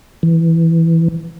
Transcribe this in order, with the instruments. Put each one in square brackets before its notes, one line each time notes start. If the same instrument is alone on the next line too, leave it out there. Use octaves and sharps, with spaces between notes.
[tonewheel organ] E3